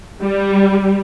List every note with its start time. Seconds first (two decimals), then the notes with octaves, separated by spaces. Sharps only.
0.22 G3